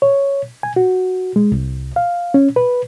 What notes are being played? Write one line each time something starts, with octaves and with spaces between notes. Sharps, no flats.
C#5
G#5
F#4
G#3
C2
F5
C#4
B4